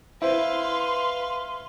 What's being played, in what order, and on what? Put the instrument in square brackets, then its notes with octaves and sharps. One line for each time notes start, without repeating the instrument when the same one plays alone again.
[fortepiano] E4 C5 [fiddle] B4 F5 [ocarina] C6